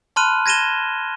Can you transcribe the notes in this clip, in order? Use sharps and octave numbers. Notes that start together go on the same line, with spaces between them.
A5 B5 C6 F6 F#6 D#7
G#6 A#6 D#7 E7 G7